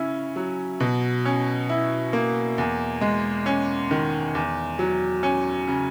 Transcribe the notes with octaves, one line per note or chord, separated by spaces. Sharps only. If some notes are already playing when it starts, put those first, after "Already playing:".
Already playing: C#3 C#4 E4
F#3
B2
C#4
E4
A#3
E2
G#3
C#4
D#3
E2
F#3
C#4
C#3